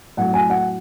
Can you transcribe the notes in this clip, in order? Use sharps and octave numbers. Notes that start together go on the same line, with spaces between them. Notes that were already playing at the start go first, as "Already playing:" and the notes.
A2 F#3 A3 F#5
G#5
F#5